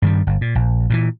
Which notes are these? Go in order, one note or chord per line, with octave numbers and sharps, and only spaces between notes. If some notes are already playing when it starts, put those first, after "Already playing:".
G2 D#3 G3
G1
A#2
A#1
A#2 C#3 E3